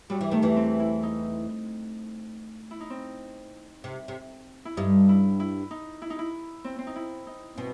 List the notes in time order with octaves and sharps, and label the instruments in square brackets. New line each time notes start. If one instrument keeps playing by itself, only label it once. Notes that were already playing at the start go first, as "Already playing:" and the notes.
[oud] F#3 [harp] G3
[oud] E3
[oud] D#3 [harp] A3
[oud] E2 E3
[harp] C4
E4
D#4
E4
D#4
C4
[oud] C3
C3
[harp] E4
[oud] G2 G3 [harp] D#4
[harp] E4
E4
D#4
E4
D#4
E4
C4
C4
D#4
E4
D#4
[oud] B2 [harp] C4